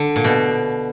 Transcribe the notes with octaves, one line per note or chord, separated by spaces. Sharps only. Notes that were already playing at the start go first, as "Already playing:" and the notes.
Already playing: D3
A#2
B2